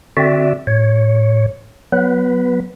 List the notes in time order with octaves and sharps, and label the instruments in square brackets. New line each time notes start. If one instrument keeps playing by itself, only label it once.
[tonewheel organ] D3 C4 F#4 D5 E5
A2 C#5
F#3 B3 B4